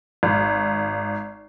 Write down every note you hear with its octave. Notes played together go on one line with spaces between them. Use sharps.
G#1